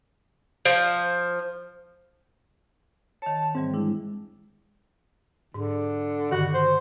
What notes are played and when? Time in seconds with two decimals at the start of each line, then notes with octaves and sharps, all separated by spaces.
0.65 F3
3.22 D#3 C#5 A5
3.55 G#2 E3 G3 C4
3.74 G#3 D4 E4
5.54 G#2 D3
6.31 G2 D3 D#3 F#4
6.53 C5